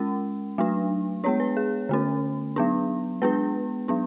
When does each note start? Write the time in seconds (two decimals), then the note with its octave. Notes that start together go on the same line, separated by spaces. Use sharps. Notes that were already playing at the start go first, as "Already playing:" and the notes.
Already playing: G#3 C#4
0.58 F#3 A3 D4
1.24 G#3 B3 D4 C#5
1.40 B4
1.57 G#4
1.89 D3 A3 C#4
2.56 F#3 B3 D4
3.22 G#3 B3 D4 B4
3.88 F#3 B3 D4